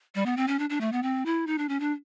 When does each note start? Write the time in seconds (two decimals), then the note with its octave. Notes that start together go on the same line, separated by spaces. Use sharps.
0.15 G3
0.26 B3
0.37 C4
0.48 C#4
0.59 D4
0.70 D4
0.81 A3
0.92 B3
1.03 C4
1.26 E4
1.47 D#4
1.58 D4
1.69 C#4
1.80 D4